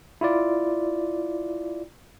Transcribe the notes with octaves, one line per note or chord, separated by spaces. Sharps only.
E4 F4 D5